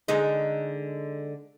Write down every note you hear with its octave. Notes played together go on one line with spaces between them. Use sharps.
D3 G#3 D#4